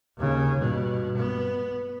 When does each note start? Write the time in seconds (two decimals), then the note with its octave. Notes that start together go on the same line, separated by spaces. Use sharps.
0.18 D#2 C#3
0.56 G2 B2
1.17 B3